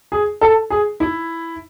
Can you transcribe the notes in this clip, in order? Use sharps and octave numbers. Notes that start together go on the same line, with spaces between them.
G#4
A4
G#4
E4